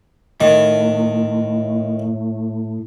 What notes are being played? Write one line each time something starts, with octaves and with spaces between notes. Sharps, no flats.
A2 D#3